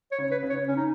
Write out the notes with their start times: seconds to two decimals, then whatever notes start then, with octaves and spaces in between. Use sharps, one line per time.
0.12 C#5
0.18 C#3
0.31 B4
0.43 C#3
0.50 C#5
0.68 C#3 C#4
0.76 D#4